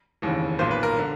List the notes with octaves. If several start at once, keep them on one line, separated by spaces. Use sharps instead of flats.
F1 D#2 C#3 E3
B1 A#2 C5
B4
A#4
D3